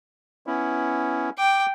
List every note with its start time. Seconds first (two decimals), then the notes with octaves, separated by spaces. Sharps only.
0.47 B3 C#4 E4
1.38 G5 D6